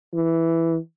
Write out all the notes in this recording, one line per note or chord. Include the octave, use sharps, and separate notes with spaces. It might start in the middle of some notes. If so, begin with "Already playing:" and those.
E3